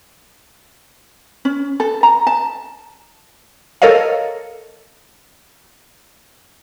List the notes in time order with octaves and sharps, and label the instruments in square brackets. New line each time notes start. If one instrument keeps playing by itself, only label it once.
[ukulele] C#4
A4
A#5
A5
[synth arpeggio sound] A4 A#4 C#5 D#5 F5